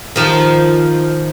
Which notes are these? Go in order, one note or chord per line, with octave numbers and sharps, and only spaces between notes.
D#3 F3